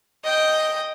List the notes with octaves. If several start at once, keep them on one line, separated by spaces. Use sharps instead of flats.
D#5 G5